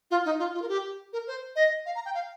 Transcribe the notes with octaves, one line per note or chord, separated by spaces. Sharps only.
F4
D#4
F4
F4
A#4
G4
A#4
C5
D#5
F5
A#5
G5
F5